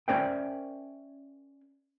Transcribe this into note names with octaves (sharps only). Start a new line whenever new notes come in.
C#4 A#4 C5 D5 E5 G5